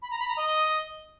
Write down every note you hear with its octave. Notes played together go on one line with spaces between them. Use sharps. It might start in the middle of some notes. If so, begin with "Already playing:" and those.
B5
A#5
B5
A#5
D#5